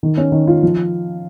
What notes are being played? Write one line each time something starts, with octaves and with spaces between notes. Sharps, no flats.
D#3
C#4
D#3
F4
F3